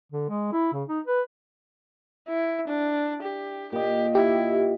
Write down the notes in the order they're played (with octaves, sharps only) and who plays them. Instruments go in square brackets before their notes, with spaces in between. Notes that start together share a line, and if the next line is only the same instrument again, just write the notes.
[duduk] D3
G#3
E4
C#3
D#4
B4
[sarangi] E4
D4
G4
[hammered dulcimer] A#2 D#5 [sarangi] G4
[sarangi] E4 [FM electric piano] G4